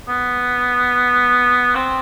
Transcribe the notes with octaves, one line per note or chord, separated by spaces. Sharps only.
B3
C4